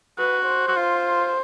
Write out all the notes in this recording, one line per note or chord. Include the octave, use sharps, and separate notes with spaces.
F#4 B4
C5
F#4
F4